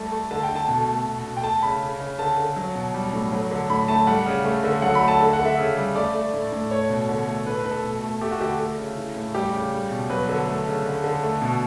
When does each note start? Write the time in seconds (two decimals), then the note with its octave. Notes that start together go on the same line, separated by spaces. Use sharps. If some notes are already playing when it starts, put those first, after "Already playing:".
Already playing: G3 A3 A5
0.12 A3
0.31 D3 A5
0.43 G5
0.49 D3
0.56 A5
0.68 B2 A5
0.87 A3
1.06 B2
1.25 B2
1.37 G5
1.43 A3 A5
1.62 C#3 B5
1.81 C#3
2.00 C#3
2.19 D3 A5
2.37 D3
2.56 F#3
2.75 B2
2.94 G3
3.13 A2
3.32 F#3
3.51 D3
3.70 A2 B5
3.88 A3 A5
4.07 G3 F#5
4.26 C#3
4.45 A3
4.64 D3
4.82 F#3 F#5
4.95 B5
5.01 A3
5.08 A5
5.20 D3
5.33 F#5
5.39 D3
5.45 E5
5.58 C#3
5.77 G3
5.95 A3 D5
6.15 A3
6.33 A2
6.52 A2
6.71 A3 C#5
6.90 B2
7.09 D3
7.27 A3
7.46 A2 B4
7.59 B4
7.65 A2
7.71 A4
7.84 B2
8.02 A3
8.21 A3 G4
8.31 F#4
8.40 D3 G4
8.59 A3
8.78 C#3
8.97 E3
9.16 A2
9.35 G3 G4
9.53 C#3
9.72 G3
9.91 B2
10.10 F#3 B4
10.29 D3
10.47 A3
10.67 C#3
10.85 D3
11.04 D3
11.23 A3
11.42 B2